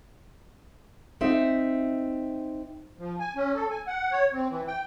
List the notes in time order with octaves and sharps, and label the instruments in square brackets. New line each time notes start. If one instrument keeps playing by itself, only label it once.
[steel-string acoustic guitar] C4 D#4 E5
[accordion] F3
G#5
C#4
A4
G#5
F#5
C#5
C4
E3
G5